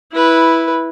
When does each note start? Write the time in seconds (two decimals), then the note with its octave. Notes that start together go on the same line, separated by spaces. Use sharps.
0.12 E4 B4